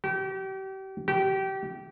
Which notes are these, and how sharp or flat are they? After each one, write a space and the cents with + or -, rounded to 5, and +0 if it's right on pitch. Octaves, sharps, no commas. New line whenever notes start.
G4 -35
G4 -25